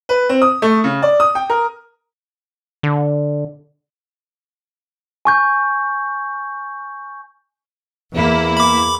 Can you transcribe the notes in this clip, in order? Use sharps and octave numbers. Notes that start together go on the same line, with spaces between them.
B4
C4
D#6
A3
C#3
D5
D#6
G5
A#4
D3
G#5 C#6 G6
E2 A#3 E4
B5 D6